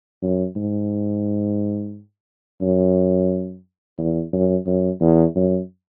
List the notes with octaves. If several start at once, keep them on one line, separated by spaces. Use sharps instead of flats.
F#2
G#2
F#2
E2
F#2
F#2
E2
F#2